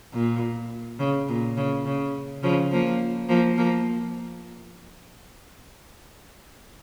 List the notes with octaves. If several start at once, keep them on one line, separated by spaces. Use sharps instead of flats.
A#2
C#3
A#2
C#3
C#3
C#3 F3
F3 A#3
F3 A#3
F3 A#3